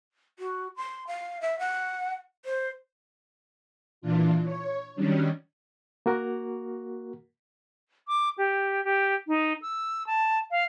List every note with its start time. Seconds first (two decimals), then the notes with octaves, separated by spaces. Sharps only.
0.39 F#4
0.76 C6
1.07 F5
1.41 E5
1.59 F#5
2.45 C5
4.02 A#2 E3 D4 F4
4.44 C#5
4.96 D#3 F#3 G3 C#4 D4
6.06 A#3 F#4 A#4
8.08 D6
8.38 G4
8.84 G4
9.28 D#4
9.62 E6
10.07 A5
10.51 F5